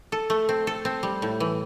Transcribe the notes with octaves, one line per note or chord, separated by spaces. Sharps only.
A4
A3
C4
A4
C4
G3
A2
E3